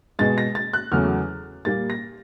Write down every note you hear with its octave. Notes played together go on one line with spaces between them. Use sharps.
B2 G#3 A6
A#6
A6
F#6
E2 C#3 F#3 A3 F6
A#2 G3 A#3 A6
A#6